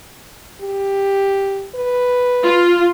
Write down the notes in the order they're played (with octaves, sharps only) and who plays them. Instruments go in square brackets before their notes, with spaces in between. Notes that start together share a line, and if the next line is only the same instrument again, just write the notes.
[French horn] G4
B4
[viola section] F4